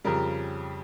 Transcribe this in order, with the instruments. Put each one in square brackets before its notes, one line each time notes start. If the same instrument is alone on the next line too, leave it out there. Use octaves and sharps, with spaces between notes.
[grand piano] F2 C#3 G3 A#4